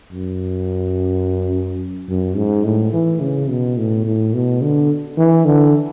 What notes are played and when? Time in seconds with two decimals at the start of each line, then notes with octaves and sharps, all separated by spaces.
0.12 F#2
2.08 F#2
2.36 G#2
2.65 A2
2.93 E3
3.21 C#3
3.49 B2
3.77 A2
4.05 A2
4.34 B2
4.62 D3
5.17 E3
5.45 D3